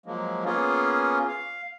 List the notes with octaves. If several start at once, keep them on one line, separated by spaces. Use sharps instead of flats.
F3 F#3 G#3 A#3
A#3 B3 C#4 F4 G#4
F5